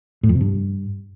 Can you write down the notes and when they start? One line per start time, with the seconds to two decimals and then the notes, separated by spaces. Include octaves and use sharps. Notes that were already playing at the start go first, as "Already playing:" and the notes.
0.23 A2
0.29 F2
0.35 C3
0.41 G2